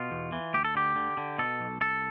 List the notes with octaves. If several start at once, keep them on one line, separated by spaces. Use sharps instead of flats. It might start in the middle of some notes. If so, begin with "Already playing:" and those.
Already playing: B2 F4
E2
E3
D2 G4
A4
D3 G4
D3
D3
B2 A4
B1
C2 A4